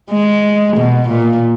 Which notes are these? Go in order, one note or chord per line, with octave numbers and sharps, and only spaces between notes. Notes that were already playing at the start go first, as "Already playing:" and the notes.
G#3
B2
A#2